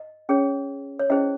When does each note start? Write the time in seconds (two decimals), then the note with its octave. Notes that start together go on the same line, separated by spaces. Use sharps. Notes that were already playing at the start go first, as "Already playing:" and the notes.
Already playing: D#5
0.29 C#4 G#4 C#5
0.99 C#5
1.10 C#4 E4 G#4 C5 D#5